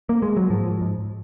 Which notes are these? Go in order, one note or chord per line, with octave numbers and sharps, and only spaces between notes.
A#3
G#3
F#3
G#2 F3
G#2